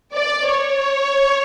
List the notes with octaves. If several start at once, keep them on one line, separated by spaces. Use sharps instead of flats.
D5
C#5